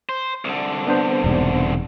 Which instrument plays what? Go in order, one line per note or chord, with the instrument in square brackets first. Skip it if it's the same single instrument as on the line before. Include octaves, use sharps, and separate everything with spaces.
[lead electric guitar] C5
C2 D3
[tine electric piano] B3 D4 C5
[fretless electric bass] E1 G#2 C3